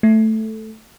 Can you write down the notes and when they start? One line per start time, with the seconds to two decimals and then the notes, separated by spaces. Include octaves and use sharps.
0.03 A3